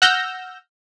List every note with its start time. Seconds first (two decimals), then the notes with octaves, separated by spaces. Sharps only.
0.02 F#5 E6 F6 G6 A#6